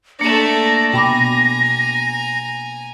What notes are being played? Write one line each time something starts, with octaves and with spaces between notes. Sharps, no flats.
A3 A#3 D4 D5 A#6
B2 G5 G#5 A#5 B5 D6